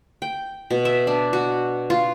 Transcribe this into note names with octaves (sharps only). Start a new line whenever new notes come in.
G5
B2
E5
D4
F#4
F4